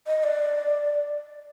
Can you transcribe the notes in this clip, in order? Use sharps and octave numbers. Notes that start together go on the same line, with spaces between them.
D#5
D5